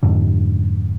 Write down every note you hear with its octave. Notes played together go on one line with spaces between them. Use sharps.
F2 G#2 D3